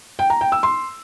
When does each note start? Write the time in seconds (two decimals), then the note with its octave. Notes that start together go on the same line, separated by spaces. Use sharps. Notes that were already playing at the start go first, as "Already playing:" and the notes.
0.19 G5
0.30 A#5
0.41 G5
0.52 E6
0.63 C6